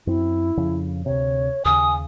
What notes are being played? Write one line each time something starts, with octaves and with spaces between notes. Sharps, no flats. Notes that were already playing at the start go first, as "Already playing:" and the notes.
F#2 C4 E4
F2 C#3 F3
D2 C3 C#5
D#2 C#3 G#5 D#6